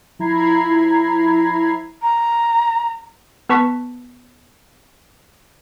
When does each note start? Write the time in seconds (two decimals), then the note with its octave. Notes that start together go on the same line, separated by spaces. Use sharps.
0.19 F3 E4 A#5 B5 G#6 C7
2.02 A#5
3.49 B3 B4 A5 C#6 B6